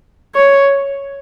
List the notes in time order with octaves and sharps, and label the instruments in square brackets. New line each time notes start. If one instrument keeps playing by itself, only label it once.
[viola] C#5